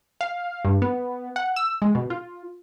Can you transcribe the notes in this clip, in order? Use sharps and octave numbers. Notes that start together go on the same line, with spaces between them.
F5
G2
B3
F#5
E6
G#3
B2
F4